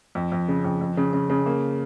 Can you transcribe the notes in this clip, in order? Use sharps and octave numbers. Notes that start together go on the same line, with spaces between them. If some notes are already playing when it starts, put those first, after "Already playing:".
F2
F2
C#3
F2
F2
C#3
C#3
C#3
A#3